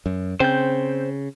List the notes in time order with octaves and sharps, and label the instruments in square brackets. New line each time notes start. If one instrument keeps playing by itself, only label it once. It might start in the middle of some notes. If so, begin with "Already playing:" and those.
[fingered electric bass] F#2
[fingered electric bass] C#3 [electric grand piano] C4 G5 [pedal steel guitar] C5 G6